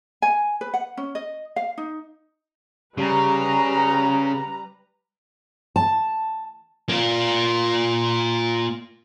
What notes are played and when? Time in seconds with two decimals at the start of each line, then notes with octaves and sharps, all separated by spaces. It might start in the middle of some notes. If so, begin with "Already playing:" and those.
0.22 G#5
0.61 B4
0.74 F#5
0.97 C#4
1.15 D#5
1.56 F5
1.78 D#4
2.98 C#3 G3 B4 A#5
5.76 A5
6.89 A#3 F4